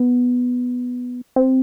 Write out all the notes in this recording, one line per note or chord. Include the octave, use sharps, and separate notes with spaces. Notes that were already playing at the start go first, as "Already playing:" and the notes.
Already playing: B3
C4